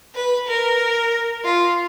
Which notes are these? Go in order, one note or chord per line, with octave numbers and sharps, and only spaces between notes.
B4
A#4
F4